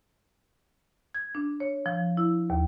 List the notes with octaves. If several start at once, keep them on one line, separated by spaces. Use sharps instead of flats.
G#6
D4
C#5
F3
E4
D#2